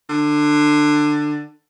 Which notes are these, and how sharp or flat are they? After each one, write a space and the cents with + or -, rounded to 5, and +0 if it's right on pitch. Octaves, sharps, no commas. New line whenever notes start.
D3 +20